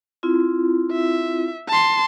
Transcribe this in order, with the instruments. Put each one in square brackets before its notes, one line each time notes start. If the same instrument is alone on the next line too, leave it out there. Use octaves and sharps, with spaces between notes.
[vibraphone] C4 E4 F4
[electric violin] E5
A5 C6